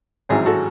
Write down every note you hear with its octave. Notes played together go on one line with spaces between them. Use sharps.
A1 G#2 F#3 C4 E4 G#4
F#4 A4